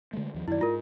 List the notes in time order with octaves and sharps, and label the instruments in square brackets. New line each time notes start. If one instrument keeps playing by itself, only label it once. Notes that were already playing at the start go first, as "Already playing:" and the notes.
[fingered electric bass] D3 G#3 A3
D#2 F3
[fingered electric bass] F#2 D#3 [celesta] E4 D5
[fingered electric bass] G#2 [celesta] F4 A#4